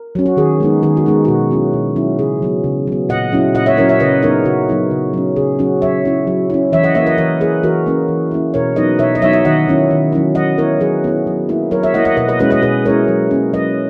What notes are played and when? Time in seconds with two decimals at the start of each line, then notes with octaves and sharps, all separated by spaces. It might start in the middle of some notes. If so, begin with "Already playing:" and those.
Already playing: A#4
0.15 F#3 C#4
0.26 F#4
0.37 D#3 G#4
0.60 G#3 B3 D#4
0.83 D#3 G#4
0.97 F#4
1.06 G#3 B3 D#4
1.25 B2 F#4
1.51 F#3 C#4 E4
1.73 B2
1.96 F#3 C#4 E4
2.19 C#3 G#4
2.42 F#3 B3
2.64 C#3
2.87 F#3 B3
3.09 A#2 D#5 F#5
3.32 F#3 C#4 E4
3.55 A#2 D#5 F#5
3.66 C#5 E5
3.77 F#3 C#4 E4 A#4 C#5
3.89 C#5 E5
4.00 C#3 B4 D#5
4.23 F#3 B3 D#4 A#4 C#5
4.45 C#3 F#4
4.69 F#3 B3 D#4
4.91 C#3
5.13 F#3 C#4
5.36 C#3 G#4
5.59 F#3 C#4 F#4
5.82 F#3 C#5 E5
6.05 C#4 E4
6.27 F#3
6.50 C#4 E4
6.72 E3 C#5 E5
6.83 D#5 F#5
6.95 A#3 E4 C#5 E5
7.06 B4 D#5
7.18 E3 A#4 C#5
7.41 A#3 E4 G#4 B4
7.63 E3 F#4 A#4
7.86 A#3 C#4 E4
8.08 E3
8.31 A#3 C#4 E4
8.54 B2 A#4 C#5
8.76 F#3 B3 D#4 B4 D#5
8.99 B2 C#5 E5
9.15 D#5
9.22 F#3 B3 D#4 C#5 E5
9.33 E5
9.45 D#3 D#5 F#5
9.68 F#3 C#4 E4
9.91 D#3
10.12 F#3 C#4 E4
10.35 F#3 D#5 F#5
10.58 B3 E4 A#4 C#5
10.80 F#3 G#4 B4
11.04 B3 E4
11.27 F#3
11.49 A#3 E4
11.71 F#3 A#4 C#5
11.83 C#5 E5
11.94 A#3 E4 D#5 F#5
12.05 D#5 F#5
12.17 B2 B4 D#5
12.29 B4 D#5
12.39 G#3 C#4 E4 B4 D#5
12.51 B4 D#5
12.62 B2 G#4 B4
12.85 G#3 C#4 E4 A#4 C#5
13.08 F#3
13.31 A#3 C#4
13.53 F#3 B4 D#5